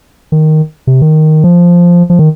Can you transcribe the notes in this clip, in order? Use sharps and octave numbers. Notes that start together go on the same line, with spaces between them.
D#3
C3
D#3
F3
F3
D#3